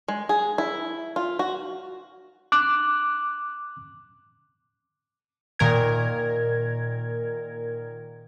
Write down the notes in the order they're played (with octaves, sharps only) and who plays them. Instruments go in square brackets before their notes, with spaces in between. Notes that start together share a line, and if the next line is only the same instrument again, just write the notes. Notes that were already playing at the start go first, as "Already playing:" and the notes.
[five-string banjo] G#3
G#4
E4
F4
F#4
[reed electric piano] D6 F#6
[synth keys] A#2 D#3 A#4 G#6